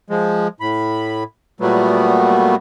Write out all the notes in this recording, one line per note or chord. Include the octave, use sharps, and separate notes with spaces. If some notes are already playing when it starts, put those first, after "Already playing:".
F3 G#3
A2 B5
A#2 F#3 G3 A3 B3